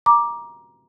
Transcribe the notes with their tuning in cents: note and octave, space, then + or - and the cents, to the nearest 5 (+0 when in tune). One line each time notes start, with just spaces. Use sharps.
A#5 +20 D6 +5